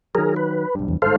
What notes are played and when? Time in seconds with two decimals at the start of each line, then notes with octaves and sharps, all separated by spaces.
0.15 D#3 F#3 G#4 A#4
0.36 B4
0.75 B1 G2
0.88 E2
1.02 G1 G#2 A4 C5 F5